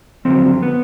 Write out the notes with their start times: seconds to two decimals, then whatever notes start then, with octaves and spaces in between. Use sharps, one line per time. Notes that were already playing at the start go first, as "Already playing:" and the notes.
0.25 F2 D3 F#3 C4
0.63 B3